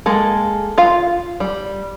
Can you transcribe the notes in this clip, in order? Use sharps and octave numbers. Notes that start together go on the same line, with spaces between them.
G#3 A#3 A4
F4 F5
G3